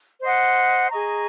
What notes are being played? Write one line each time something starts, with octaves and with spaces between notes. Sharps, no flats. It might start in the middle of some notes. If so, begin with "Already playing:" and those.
C5 D#5 F#5
G#4 D#5 A#5 C#6